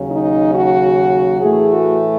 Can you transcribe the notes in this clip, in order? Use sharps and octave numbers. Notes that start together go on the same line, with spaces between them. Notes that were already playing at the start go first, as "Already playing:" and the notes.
Already playing: D#2 C#3 F#3
D#4
F#4
A2 E3 A3 G#4
F#4